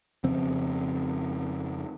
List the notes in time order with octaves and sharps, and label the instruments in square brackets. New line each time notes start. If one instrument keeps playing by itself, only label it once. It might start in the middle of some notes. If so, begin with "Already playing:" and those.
[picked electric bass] F2 C#3 C4